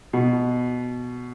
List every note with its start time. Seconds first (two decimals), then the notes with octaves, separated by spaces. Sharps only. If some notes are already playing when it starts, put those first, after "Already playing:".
0.13 B2